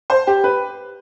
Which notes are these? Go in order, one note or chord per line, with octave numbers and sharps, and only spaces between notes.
C5
G4
B4